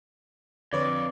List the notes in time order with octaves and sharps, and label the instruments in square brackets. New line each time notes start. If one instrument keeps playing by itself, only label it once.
[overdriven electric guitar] F2 [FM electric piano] D3 B4 C#5 [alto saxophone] D5